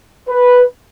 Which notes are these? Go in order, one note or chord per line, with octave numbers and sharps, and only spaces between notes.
B4